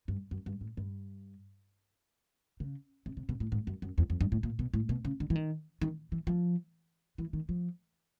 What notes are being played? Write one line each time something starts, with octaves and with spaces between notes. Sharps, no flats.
G2
F#2
G2
A2
G2
C#3
C3
C3
B2
A2
G#2
F#2
F#2
E2
F2
G2
A2
A#2
B2
A2
B2
C#3
D3
E3
D#3
D#3
E3
F3
E3
D#3
F3